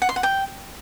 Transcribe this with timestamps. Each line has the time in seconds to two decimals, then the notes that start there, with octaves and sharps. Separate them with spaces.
0.02 F#5
0.09 C6
0.16 F#5
0.23 G5